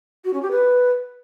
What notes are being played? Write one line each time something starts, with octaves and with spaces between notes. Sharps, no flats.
F#4
C#4
G4
B4